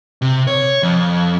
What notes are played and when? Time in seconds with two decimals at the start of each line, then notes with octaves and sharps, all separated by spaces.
0.22 C3
0.47 C#5
0.83 F2